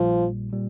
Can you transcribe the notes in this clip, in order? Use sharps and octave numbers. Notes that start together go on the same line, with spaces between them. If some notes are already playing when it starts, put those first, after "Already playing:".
Already playing: A#1 A#2 F3 G3
A#2 G3